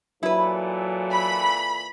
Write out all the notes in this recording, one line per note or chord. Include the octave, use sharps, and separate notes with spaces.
A#2 E3 F#3 E4 A4 B4
B5